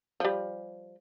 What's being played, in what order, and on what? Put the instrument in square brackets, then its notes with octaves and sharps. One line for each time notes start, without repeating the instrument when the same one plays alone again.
[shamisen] F3 G3